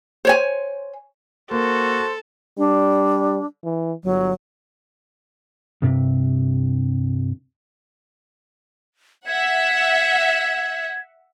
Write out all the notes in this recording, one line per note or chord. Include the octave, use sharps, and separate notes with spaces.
C5 C#5 G#5
A#3 F#4 A4 C5
G3 D4
E3
G1 F#3
C2 G2 C3
E5 F#5 G#6